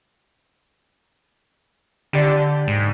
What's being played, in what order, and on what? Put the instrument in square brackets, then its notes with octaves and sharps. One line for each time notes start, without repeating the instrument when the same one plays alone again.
[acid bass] D3 [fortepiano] G4 D5
[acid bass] G#2